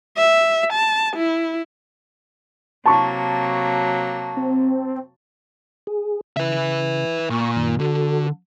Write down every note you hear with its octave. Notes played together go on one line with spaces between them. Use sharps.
E5
A5
E4
C3 F#3 A#3 A5 C#6
C4
G#4
C#3 B4 E5
A#2 C#6
F#2 D#3
D3 F#4 A4